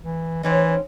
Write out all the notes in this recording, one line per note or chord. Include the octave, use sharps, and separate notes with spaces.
E3
E3 C4 C#4 D#4